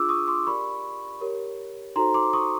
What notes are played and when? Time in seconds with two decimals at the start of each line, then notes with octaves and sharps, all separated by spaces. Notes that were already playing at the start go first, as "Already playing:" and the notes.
Already playing: D4 F4 G#4 D6 E6
0.09 C#6 D#6
0.28 C6 D6
0.47 G4 A#4 D5 B5 C#6
1.21 G4 A#4 C#5
1.96 D#4 F#4 A4 C5 A#5 C6
2.14 C6 D6
2.33 C#6 D#6